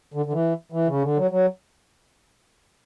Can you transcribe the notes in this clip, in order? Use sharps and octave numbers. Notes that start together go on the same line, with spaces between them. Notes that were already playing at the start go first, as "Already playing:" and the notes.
D3
D3
E3
E3
C#3
D3
F#3
F#3